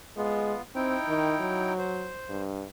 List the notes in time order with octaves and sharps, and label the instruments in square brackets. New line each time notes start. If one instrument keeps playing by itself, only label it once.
[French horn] G#3 [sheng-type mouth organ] B3 F4
[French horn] C4 [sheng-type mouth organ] D#4 E4 G5
[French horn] D#3
F#3
[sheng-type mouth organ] C5
[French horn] G2